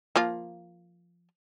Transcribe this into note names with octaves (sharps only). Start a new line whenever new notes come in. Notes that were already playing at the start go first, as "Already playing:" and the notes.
F3 A#3 F4